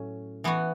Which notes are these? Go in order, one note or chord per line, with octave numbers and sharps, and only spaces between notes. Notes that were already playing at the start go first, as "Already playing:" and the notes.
Already playing: A2 F#3 C#4
E3 B3 F#4